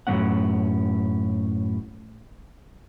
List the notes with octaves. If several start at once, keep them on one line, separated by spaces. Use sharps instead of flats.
F#2 A2 D#3 A#3 C#4 F#5